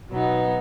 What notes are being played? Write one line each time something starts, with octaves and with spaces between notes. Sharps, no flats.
B2 F#3 B3 D#4